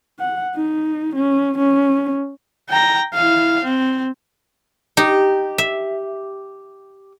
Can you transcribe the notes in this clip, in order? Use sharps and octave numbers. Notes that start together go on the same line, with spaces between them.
F#5
D#4
C#4
C#4
G5 A#5
E4 F5
C4
D#4 G4
E5